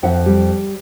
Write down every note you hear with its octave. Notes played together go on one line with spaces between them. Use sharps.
F2 E5 F#5
G3